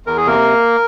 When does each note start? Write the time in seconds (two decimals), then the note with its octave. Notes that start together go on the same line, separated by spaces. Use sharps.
0.06 E2 A#4
0.17 G#4
0.25 C3 A#3 A#4